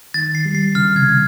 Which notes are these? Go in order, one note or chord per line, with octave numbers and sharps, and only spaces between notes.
D#3 A6
C7
G3
C7
C#3 F6
C3 G#6